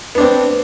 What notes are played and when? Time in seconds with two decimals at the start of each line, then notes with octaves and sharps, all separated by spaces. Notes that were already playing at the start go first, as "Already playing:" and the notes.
0.15 B3
0.18 D4
0.20 C4